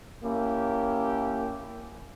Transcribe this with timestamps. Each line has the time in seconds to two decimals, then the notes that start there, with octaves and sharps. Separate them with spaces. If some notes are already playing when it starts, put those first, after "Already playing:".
0.23 A#3 C#4 E4 G4